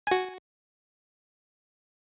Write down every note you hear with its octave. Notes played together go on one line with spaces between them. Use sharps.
F#4 G#5